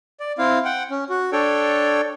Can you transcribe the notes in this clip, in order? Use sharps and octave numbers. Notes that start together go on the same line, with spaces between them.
D5
C4 E4 F5
F#5 G5
C#4
F#4
D4 A4 C#5 G5